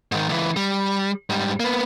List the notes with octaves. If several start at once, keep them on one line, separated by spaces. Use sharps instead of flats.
G#2 D#3
C#2 E3
G3
G#2 G3
A#3 B3